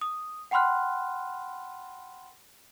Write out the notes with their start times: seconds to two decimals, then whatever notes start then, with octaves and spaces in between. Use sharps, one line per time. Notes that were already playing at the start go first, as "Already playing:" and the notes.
0.01 D#6
0.51 F#5 G5 B5 C6 F6 F#6